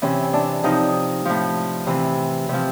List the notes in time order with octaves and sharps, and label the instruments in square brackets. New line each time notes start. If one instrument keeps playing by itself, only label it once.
[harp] C3 E3 C#4
D4
C3 F3 D#4
A2 F3
C3 E3
C3 F3